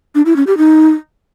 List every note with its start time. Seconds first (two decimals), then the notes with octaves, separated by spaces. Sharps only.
0.15 D4
0.26 E4
0.36 C#4
0.47 G4
0.57 D#4